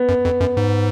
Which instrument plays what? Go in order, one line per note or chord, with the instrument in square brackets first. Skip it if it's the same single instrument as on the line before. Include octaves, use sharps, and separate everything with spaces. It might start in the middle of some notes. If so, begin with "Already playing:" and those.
Already playing: [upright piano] B3
[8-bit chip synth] F#2
F2
F#2
G#2